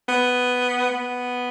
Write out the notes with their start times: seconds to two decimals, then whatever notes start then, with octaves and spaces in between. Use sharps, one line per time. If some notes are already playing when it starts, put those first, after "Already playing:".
0.08 B3
0.91 B3